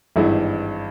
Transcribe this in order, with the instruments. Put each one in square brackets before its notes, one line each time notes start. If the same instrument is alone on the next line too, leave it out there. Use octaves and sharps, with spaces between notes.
[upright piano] G#1 G2 E3 G#3 E4